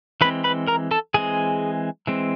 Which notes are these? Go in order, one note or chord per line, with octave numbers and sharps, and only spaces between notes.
E3 G#3 C4 B4 B5
B4 B5
A#4 A#5
A4 A5
E3 G#3 C4 G#4 G#5
E3 G#3 C4